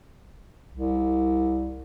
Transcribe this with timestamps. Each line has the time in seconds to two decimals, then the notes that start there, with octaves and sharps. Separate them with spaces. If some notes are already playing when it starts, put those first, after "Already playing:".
0.73 C2